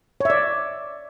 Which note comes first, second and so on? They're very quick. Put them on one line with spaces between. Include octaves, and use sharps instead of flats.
C#5 E5 D5